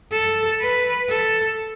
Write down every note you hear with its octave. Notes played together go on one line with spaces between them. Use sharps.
A4
B4
A4